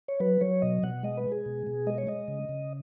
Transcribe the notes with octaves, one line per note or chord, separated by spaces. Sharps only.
C#5
F#3 B4
F#3 C#5
B2 D#5
B2 F#5
G#3 D#5
B4
G#3
G#4
B2
B2
G#3 D#5
C#5
G#3 D#5
C#3
C#3